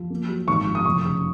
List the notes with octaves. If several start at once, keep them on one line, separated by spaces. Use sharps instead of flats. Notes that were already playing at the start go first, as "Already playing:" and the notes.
Already playing: F3
A#3
F#3
G#1 C#6
F3
D#6
F1 C#6
C#3